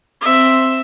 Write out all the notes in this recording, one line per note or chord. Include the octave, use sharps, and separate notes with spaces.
C4 E5